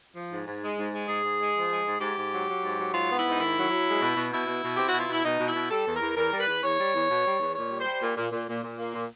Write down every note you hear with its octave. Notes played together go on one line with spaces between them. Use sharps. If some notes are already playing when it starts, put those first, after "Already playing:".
F3
G#2
G#2
G#3
G#2
G#3
G#2 G#4
G#2
G#3
F3
G#3
G#2
G#2 G4
G#2
F#3
F#3
G#2
F#3
G#2 F4
B3
E4
G#2
D#4
D#3 E4
F#3
F#3
G#3
B2
B2
B2 E4
B2
B2
C4 G4
B2 F#4
F4
B2 E4
B2 D#4
B2
E4
B2
G3 A4
E2
A#4
E2
E2 A#4
G3
B4
E2
E2 C#5
G3
E2
B2
G3
E2
A#2 C#5
G3
C5
G3
A#2
A#2
A#2
A#2
A#2
A#3
A#2